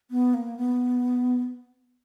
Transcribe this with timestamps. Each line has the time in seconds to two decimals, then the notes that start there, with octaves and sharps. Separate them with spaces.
0.11 B3
0.34 A#3
0.57 B3